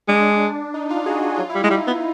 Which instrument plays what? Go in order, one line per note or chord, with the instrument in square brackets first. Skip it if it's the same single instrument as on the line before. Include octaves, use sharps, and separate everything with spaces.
[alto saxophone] G#3 [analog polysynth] D4
[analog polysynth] D#4
D#4 F4
F#4 G#4
F#4
[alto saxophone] F#3 [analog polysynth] F4
[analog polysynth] E4
[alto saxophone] G3
[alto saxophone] G#3 [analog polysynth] D#4 F4
[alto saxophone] G3
B3